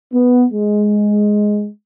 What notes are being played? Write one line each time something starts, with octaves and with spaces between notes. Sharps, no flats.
B3
G#3